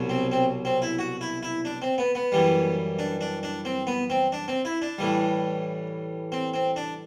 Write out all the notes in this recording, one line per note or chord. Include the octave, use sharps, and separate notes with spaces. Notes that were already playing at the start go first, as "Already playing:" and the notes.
Already playing: C2 B2 F#3
C4
C4
C4
E4
F#4
E4
E4
D4
C4
B3
B3
F#2 E3 G3
D4
D4
D4
C4
B3
C4
D4
C4
E4
D4
A2 E3 G3
C4
C4
D4